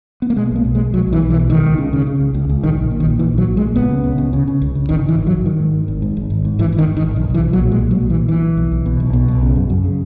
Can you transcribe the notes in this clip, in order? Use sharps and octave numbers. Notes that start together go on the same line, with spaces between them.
B3
A#3
B2 G#3
B1 A#3
B2
G#3
B2
B1 F#3
B1
E3
B1
E3
B2
C#2 D#3
C#2
C#3
C#3
C#3
C#2
C#2
C#2
A#1 D#3
A#1
A#2
D#3
A#1
A#2 E3
A#1 F#3
A#1
G#3
A#2
C#2 B3
C#3
C#2
C#3
C#3
C#3
C#2
C#3
G#1 D#3
G#1 E3
G#1
F#3
G#1
G#1 D#3
G#2
G#2
G#1
G#2
G#1
G#1
G#2
G#1 E3
G#1
D#3
G#1
D#3
G#1
B1
B1
E3
B1
F#3
A#2
B1 G#3
B1 F#3
A#2
E3
A#2
B2 E3
B1
B1
B1
B2
B1
B2
B1
C#3
F#2
F#2
C#3